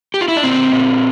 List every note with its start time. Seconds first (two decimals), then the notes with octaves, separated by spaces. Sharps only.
0.14 G4
0.21 F4
0.28 E4
0.36 D4
0.44 A#2 C4
0.72 A#2